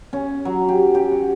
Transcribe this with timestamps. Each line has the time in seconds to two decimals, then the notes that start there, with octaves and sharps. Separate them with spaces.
0.13 C#4
0.45 F#3
0.69 G4
0.95 G4
1.11 F#4